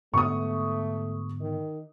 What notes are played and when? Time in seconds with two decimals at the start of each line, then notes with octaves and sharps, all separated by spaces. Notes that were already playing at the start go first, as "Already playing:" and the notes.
0.14 G#2 D3 A3 B3 C#6 D#6
1.40 D#3